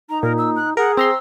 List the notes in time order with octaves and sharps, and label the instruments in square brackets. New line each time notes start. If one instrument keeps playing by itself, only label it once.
[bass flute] D#4 [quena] A#5
[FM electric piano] A#2 [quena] A#4
[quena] E6
F#6
[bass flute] G#4 [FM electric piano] A#4 [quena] F#5
[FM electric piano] C4 A#5 C6 [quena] E6